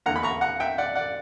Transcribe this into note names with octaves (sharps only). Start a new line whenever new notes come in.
E2 D3 A#3 F#5 A#5
B5
A#5 C#6
F#5 A#5
E5 G5
D5 F#5
D5 F#5